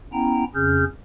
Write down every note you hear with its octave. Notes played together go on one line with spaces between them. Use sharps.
B3 C#4 E4 G5 A#5
F2 C#3 C#4 G#4 F6 G6